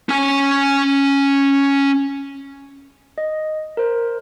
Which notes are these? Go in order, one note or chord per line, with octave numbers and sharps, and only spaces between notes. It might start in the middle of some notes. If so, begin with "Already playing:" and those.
C#4 G#5
D#5
A#4 C5